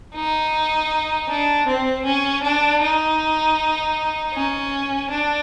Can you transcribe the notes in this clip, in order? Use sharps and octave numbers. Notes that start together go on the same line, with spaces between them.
D#4
D4
C4
C#4
D4
D#4
C#4
D4